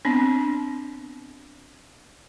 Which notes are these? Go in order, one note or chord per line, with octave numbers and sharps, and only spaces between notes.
B3 C4 D4